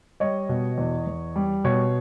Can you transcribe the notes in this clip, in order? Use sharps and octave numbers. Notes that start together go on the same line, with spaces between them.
G3 C#5 D#5
B2
E2
E2
G3
B2 C#5